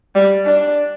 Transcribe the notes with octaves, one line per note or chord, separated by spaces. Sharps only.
G3
D4